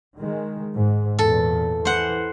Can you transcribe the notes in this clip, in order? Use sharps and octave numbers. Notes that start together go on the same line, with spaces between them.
D#3 G#3
G#2
E2 A#2 A4
E3 C5 F#5